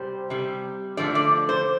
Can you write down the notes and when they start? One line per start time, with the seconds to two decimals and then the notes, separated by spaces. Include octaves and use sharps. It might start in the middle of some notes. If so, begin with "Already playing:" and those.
Already playing: C3 G3 C5
0.30 C3 G3
0.97 D3 F3 A3 D5
1.15 D5
1.49 C5